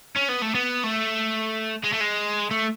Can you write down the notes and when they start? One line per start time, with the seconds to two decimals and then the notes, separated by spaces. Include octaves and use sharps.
0.16 C#4
0.28 B3
0.42 A3
0.55 B3
0.84 A3
1.84 G#3
1.93 A3
2.01 G#3
2.51 A3